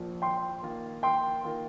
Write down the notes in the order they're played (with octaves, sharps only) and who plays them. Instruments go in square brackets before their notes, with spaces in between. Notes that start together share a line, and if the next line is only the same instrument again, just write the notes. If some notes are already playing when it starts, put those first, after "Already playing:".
Already playing: [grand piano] A#1 A#2 F3
[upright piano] G5 C6
[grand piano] D#3 A#3 F4
[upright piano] G5 C6
[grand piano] D#3 A#3 F4 A#4